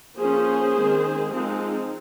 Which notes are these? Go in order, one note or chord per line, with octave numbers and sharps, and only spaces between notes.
F3 A#3 C#4 G#4 C5
D#3 G#3 C4
F3 G#3 C4 D#4